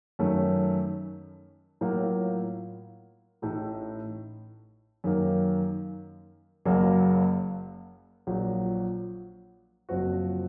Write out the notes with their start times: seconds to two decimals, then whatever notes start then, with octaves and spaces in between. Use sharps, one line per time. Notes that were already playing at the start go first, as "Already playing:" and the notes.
0.19 F#2 D#3 A3 C#4
1.81 A2 F#3 A#3 F4
3.42 A1 A2 A3 D#4
5.04 F#2 D#3 A#3
6.65 F#1 F#2 C#3 F#3 A#3
8.27 A#1 A#2 F#3
9.89 F#1 F#2 F3 C4 F#4